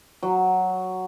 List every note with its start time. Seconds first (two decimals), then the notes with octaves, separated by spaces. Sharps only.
0.23 F#3